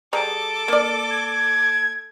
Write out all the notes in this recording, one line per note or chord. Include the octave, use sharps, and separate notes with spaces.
G3 G#4 A4 A#5 D6
A#3 D5
G#6